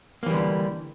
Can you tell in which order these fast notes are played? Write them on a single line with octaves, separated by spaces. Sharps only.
A#3 E3 G3 D3